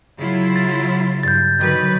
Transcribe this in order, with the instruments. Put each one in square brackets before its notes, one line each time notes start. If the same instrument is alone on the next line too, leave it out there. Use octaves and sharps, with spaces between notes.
[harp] C#3 [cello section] F#3 E4 F4
[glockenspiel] A6
[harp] G2 [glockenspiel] G6 A6
[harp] B2 D3 F#3 [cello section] D#3 B4